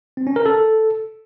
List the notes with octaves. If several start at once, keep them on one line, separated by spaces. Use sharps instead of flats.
C4
C#4
A#4
A4